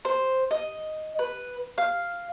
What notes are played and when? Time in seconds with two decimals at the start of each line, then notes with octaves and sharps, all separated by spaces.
0.05 C5
0.51 D#5
1.19 B4
1.78 F5